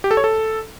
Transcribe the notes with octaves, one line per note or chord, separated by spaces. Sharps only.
G4
A4
C#5
A4